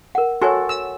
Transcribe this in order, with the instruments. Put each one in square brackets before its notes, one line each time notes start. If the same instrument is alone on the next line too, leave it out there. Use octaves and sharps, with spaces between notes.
[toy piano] A#4 F#5
[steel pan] F#4 A4 [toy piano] C#5 G#5 C6
[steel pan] E6